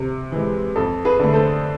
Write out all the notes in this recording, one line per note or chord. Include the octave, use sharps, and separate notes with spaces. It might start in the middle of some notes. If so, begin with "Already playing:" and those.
Already playing: C3
E3 G#3
F2 A4
G#4 B4
D3 A3
A4 C5